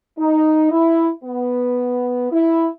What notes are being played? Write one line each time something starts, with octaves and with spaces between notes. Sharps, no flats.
D#4
E4
B3
E4